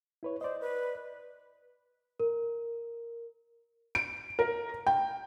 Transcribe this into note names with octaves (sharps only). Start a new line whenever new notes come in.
E4 B4 C#5
C5 D5 D#5
B4
A#4
D7
A#4
G5